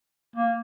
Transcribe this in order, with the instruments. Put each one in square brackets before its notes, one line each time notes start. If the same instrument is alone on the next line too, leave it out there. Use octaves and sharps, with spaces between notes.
[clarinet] A#3